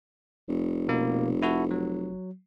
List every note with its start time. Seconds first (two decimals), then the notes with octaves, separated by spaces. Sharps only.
0.48 F1
0.88 B2 A#3
1.42 E4 F#4 A4
1.71 F#3